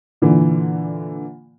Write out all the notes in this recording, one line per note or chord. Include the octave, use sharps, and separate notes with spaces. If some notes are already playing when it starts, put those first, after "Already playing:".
A#2 D3 E3